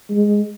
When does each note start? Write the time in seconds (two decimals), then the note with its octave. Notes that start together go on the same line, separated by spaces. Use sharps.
0.11 G#3